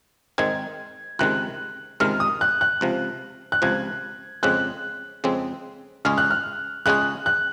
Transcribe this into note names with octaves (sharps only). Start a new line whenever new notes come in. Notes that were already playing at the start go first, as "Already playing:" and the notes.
G#2 D#3 G#3 C4 G#6
C#2 C3 D#3 G#3 F#6
C#2 C3 D#3 G#3 F6
D#6
F#6
F#6
C#2 C3 F3
F#6
C#2 C3 F3 G#6
F2 C#3 G#3 C4 F#6
F2 C#3 G#3 C4
C#2 C#3 G#3 C#4 G#4 F6
F#6
F6
C#2 C#3 G#3 C#4 G#4 F#6
F#6